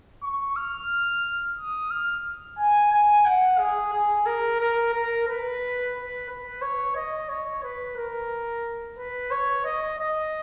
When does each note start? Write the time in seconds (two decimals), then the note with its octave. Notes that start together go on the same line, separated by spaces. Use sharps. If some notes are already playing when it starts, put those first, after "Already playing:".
0.22 C#6
0.56 F6
1.58 D#6
1.90 F6
2.58 G#5
2.92 G#5
3.26 F#5
3.59 G#4
3.93 G#4
4.26 A#4
4.60 A#4
4.94 A#4
5.28 B4
5.95 B4
6.29 B4
6.62 C#5
6.96 D#5
7.29 C#5
7.63 B4
7.97 A#4
8.98 B4
9.31 C#5
9.65 D#5
9.99 D#5